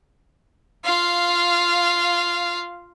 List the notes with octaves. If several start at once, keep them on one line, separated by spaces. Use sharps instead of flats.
F4 F5